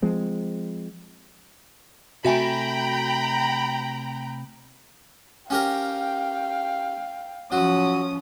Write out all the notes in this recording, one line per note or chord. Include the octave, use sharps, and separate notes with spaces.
F3 G#3 C4
C3 A3 F#4 E5 G5 G#5 A#5 B5
C#4 G4 A#4 F5 G5
F3 F#3 C#4 D#6